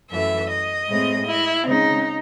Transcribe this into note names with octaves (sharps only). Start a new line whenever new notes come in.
F#2 E3 A3 E5
D#5
A2 G#3 C4
E4
C#3 G#3 C4 D#4